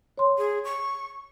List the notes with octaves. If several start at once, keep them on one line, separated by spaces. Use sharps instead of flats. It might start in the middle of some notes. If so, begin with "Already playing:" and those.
C#5 C6
G#4
C#6